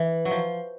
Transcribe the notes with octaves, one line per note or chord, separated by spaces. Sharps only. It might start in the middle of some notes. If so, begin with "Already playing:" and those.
Already playing: E3
F#3
F3